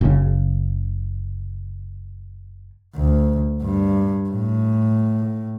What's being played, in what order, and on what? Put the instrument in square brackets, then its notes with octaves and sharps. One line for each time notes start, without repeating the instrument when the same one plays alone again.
[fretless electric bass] F#1 C#3
[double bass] D2
G2
A2